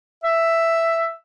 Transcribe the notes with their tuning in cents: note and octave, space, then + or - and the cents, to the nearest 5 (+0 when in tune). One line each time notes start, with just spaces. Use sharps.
E5 +5